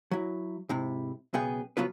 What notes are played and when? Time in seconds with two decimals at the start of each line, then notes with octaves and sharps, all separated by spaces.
0.11 F#3 E4
0.69 G#2 C3 E4
1.34 B1 C#3 B3 G#4 G5
1.77 C#3 F#3 B3 F4 B4